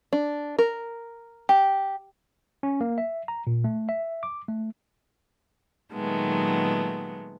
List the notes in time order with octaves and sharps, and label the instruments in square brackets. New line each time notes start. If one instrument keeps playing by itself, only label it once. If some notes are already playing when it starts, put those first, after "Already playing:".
[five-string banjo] D4
A#4
G4
[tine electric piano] C#4
A#3
E5
A#5
A#2
A3
E5
D6
A3
[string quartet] A#2 D#3 F#3 G#3 A3 B3